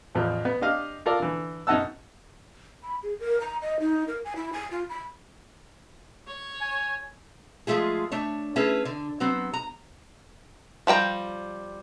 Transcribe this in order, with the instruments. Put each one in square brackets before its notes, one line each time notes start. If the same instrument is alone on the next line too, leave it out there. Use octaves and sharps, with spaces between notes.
[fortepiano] A1 E2 F3
B3
D4 G4 D#5 F5
F4 A4 A#4 D5
D3 E3
F#2 D#4 D#5 F#5 A5 E6
[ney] B5
G#4
A#4
A#5
D#5
D#4
A#4
G#5
E4
G#5
F4
B5
[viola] C#5
[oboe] G#5
[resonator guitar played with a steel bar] F3 G#3 A3 F4 G#4
A3 D4 C#5
A3 C#4 E4 G#4 B4
D3
F#3 B3 C4
A#5
[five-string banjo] F3 G3 G5 A#5